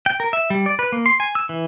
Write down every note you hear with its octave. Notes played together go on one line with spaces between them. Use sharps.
G5
A#4
E5
G3
D5
B4
A#3
C6
G#5
E6
E3